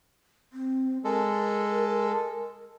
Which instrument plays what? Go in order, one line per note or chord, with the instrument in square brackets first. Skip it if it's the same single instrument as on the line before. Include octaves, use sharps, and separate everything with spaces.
[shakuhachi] C4
[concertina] G#3 A4 [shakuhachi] A#4